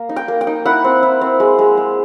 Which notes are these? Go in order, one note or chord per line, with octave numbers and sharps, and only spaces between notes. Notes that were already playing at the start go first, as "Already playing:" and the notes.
Already playing: A#3
D#4
G5
A#3
G5
D#4
E4 F#5
C4
E4
C4
G#3
G#3
G#3